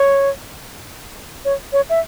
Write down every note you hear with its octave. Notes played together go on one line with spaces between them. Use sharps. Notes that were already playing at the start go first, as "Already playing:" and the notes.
Already playing: C#5
C#5
C#5
E5